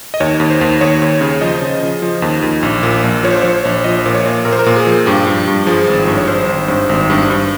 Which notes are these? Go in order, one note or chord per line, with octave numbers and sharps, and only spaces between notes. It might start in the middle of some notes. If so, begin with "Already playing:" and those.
D#5
D#2 C#5
D#2
C5
D#2
D#2 C#5
D#2
C#3
F3 D#5
C#3
C#3
F3
D#2
D#2
A#1
A#2
A#1
F3 C#5
C5
F3 C#5
A#1
F3 D#5
A#2
C#5
A#2
A#2 A#4
C5
A#4
A#2
G#4
F3
G2 G4
G2
G2
F3 G#4
G#1
G2
C#5
G#1 C5
G#1
G2
G#1
G2
G2